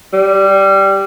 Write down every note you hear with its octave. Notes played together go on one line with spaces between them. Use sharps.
G3